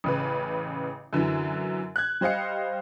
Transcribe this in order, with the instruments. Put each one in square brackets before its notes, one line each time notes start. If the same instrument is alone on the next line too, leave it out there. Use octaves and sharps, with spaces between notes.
[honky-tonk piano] A1 C#3 B4
F#2 D3 E3 F#3
F#6 G#6
G3 C5 D#5 F5 C#7